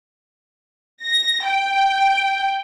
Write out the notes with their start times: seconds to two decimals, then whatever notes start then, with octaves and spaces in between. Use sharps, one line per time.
1.04 A#6
1.45 G5